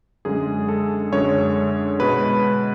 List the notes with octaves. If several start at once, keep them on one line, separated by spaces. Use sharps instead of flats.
F#2 D3 G#3 G#4
A4
F#2 D3 G#3 C#5
B2 G#3 B4